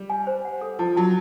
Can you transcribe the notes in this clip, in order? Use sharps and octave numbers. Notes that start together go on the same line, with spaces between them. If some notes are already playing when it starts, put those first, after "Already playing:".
Already playing: G3
G#5
C5
F#5
A4
F3 A5
F#3 A5